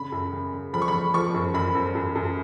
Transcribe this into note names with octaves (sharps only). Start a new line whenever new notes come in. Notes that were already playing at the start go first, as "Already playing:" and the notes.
Already playing: C#3 B5
F#2
C#3
C#3
F3 B5
C#6
B5
F3
F3 C#6
F#2
F#2 B5
F#2
F#2
F#2